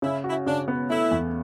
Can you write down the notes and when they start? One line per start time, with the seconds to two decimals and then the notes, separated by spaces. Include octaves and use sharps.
0.02 C#3 E4
0.24 F#4
0.30 E4
0.46 C#3 D4
0.68 B3
0.89 A3 E4
1.11 E2